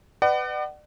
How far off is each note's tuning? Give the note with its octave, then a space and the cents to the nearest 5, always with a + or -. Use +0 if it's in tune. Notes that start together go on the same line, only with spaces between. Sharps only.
B4 +20 D5 +40 F#5 +30